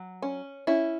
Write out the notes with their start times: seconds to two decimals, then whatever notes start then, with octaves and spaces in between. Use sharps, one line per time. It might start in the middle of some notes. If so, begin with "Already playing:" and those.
Already playing: F#3
0.22 C#4
0.67 C#4 E4